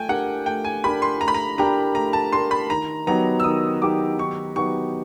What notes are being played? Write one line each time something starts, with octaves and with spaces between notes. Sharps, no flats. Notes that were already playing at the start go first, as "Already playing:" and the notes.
Already playing: A3 G5 G#5
D4 G4 A#4 F#5
A3 G5
G#5
D4 G4 A#4 B5
C6
A3 A#5
B5
A#5
D4 G4 A#4 A#5
A3 A#5
A5
D4 G4 A#4 C6
B5
D#3 A#5
F#3 B3 D#4 G4 A#5
E6
D#3 D#6
F#3 B3 D#4 G4 D6
D#3 C#6
F#3 B3 D#4 G4 C#6